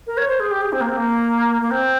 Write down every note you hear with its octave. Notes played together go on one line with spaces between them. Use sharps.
A#4
C#5
C5
G#4
G4
G#4
C4
A#3
C4
A#3
A#3
C4